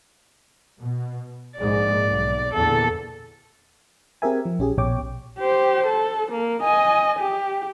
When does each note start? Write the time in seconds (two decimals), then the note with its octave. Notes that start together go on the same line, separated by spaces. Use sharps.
0.79 B2
1.58 A#1 G#2 G#3 D5
2.09 B1
2.54 E2 A#2 D3 A4
4.22 C4 G4 G#4 A#4 E5 G#5
4.45 F3
4.59 A#1 C#4 G4 G#4
4.78 A#1 B2 C#5 G5 D6
5.38 G4 C5
5.87 A4
6.32 A#3
6.63 D#5 G#5
7.19 G4